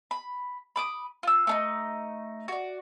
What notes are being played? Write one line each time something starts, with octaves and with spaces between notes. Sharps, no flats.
B5
B5 D6 D#6
F4 E6
A3 D4 D#4
F#4 D5